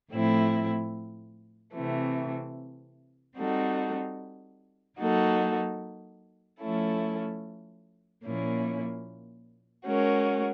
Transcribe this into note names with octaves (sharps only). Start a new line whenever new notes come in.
A2 F3 A3 C4 E4
C3 E3 A3 C4
G3 C4 D#4 F#4 A4
F#3 A#3 D#4 F#4 A4
F3 A3 C#4 E4 A4
A#2 F3 A#3 C#4 E4
G#3 C#4 F#4 A#4